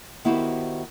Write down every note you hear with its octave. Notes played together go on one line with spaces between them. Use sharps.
D#3 B3 E4 F#4 G4 C5